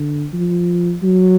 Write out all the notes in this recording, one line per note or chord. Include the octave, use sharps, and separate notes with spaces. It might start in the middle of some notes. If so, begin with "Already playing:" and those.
Already playing: D3
F3
F#3